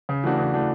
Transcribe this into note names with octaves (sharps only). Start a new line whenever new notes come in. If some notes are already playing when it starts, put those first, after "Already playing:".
C#3
E3 A3 D4 F#4
C#3
E3 A3 D4 F#4